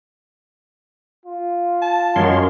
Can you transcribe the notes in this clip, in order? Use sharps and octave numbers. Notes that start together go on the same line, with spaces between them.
F4
A5
F#2 F#4 A#4 C#5 D#5 C6